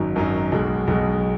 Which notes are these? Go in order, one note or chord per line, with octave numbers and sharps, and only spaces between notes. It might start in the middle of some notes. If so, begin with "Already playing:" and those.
Already playing: G#1 F#2 F#3 D#4
G#1 F#2 F#3 D#4
B1 B2 G#3
B1 B2 G#3